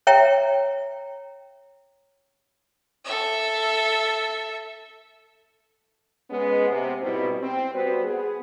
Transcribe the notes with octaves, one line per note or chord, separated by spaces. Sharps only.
C#5 E5 G5 A#5
A4 E5
G#3 B3 C#4
C3
G#2 B2 G3 B3 C4 E4
C4
G3 B3 F#4 B4 C5
B3 G#4